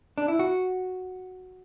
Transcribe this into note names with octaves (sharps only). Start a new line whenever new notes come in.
D4
E4
F#4